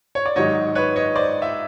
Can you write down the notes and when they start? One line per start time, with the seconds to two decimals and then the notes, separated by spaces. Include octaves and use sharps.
0.15 C#5
0.25 D5
0.36 G#2 D#3 F#3 C#5 D#5
0.75 B4 C#5
0.96 C#5 D#5
1.15 C5 D5
1.42 E5